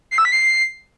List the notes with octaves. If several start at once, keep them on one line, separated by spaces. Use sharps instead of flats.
C7
E6
B6
C7